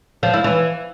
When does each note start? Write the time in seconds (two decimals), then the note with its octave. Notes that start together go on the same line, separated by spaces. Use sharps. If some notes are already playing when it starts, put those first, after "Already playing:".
0.23 F3
0.34 E4
0.44 E3